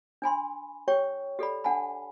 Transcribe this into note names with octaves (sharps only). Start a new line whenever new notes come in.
D4 G#5 B5 C6
G4 C#5 G5 C#6
G4 A4 D5 B5
D4 F#5 G#5 A5 B5